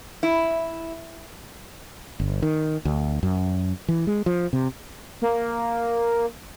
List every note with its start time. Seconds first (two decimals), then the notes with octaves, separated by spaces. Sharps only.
0.23 E4
2.20 G1
2.42 D#3
2.85 D2
3.23 F#2
3.88 E3
4.07 G#3
4.26 F3
4.53 C3
5.22 A#3